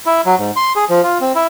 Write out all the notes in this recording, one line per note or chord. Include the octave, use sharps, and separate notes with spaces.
E4
F#3
G#2
C6
G#4
F3
F4
C4
E4